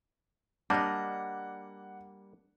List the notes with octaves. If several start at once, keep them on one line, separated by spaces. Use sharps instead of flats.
G3 A#3 D4 D#5 F#5